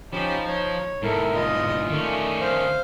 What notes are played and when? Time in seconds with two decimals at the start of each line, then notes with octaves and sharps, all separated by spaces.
0.13 F3 C#4 D#4 G4 B5
0.48 C#5
1.03 E2 G#2 E4 A4 A#4
1.35 F4 D#5
1.89 D#3 A3 C#4 D5
2.41 C5 F5